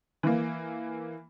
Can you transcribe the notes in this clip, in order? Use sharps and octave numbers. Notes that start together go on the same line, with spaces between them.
E3 A#3